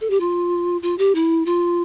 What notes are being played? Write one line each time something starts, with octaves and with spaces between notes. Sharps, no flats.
A4
G4
F4
F4
G4
E4
F4